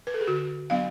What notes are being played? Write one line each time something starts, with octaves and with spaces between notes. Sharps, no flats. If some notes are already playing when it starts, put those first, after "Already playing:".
B4
A4
G#4
D3 F#4
F#3 B3 D4 F5